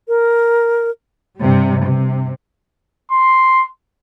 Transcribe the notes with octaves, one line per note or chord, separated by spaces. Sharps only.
A#4
G2 C3 G3
C3
C6